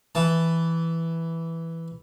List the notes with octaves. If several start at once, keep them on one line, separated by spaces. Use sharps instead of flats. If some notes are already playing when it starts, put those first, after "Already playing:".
E3 A5